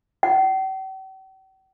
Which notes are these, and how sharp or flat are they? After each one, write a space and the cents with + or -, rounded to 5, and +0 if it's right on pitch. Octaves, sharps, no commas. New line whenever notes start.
G5 -45